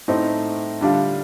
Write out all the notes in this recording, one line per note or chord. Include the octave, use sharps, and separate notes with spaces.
A2 A3 C4 D#4
D3 G3 D4 F4